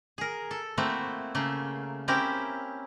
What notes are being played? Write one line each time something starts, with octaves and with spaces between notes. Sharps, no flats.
G#4 A#4
A4
A3 A#3 C4 E4 F#4
C#3 A3 A#3
C4 C#4 E4 G4 A#4